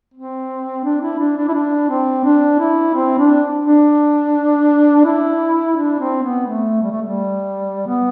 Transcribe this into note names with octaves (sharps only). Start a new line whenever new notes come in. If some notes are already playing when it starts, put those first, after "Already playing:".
C4
D4
E4
D4
D4
E4
D4
C4
D4
E4
C4
D4
D4
E4
D4
C4
B3
A3
G3
A3
G3
B3